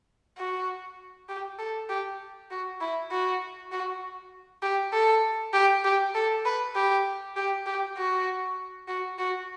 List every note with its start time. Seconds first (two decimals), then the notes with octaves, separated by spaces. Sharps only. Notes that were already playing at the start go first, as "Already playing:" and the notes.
0.38 F#4
1.29 G4
1.59 A4
1.89 G4
2.50 F#4
2.81 E4
3.11 F#4
3.72 F#4
4.62 G4
4.93 A4
5.53 G4
5.84 G4
6.15 A4
6.45 B4
6.75 G4
7.36 G4
7.66 G4
7.97 F#4
8.88 F#4
9.18 F#4